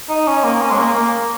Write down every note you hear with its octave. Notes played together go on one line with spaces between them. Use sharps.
D#4
C#4
A#3
C#4
G#3
A#3
A#3